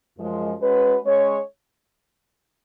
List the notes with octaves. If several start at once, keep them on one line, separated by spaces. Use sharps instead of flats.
F#2 F3 G#3
G#3 C#4 F#4 B4
G#3 C#4 G#4 C#5